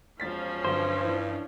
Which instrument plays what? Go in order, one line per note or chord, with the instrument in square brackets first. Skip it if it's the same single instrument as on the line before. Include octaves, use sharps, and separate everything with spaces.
[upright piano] E1 A6 B6 [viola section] F3 C#4
[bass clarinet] G2 [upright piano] D3 F#3 C4 [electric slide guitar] C5
[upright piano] E3 D4